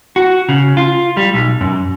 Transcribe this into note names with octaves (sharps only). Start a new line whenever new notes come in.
F#4
C#3
F4
G3
B1
F#2